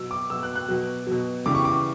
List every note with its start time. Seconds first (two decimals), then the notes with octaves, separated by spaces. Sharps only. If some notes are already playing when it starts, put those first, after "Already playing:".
Already playing: B2 F#3 E6
0.11 D6
0.30 B2 F#3 E6
0.43 F#6
0.56 F#6
0.68 B2 F#3
1.07 B2 F#3
1.46 C#3 E3 G3 D6
1.55 C#6
1.65 D6